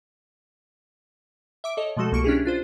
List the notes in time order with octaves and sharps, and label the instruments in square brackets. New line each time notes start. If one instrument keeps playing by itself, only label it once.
[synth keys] E5 D6 D7
A4 C#5 D#5
B2 F3 G#3 A3 F#4 A4
C2 A#3 C#6 C#7 D7 E7
C#4 D4 E4 G4 G#4
D4 F4 C5